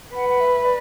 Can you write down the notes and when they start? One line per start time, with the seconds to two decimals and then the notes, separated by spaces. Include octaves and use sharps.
0.15 B4 F#5
0.29 F#5
0.41 E5
0.65 D5